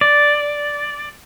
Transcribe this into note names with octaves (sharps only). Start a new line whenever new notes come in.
D5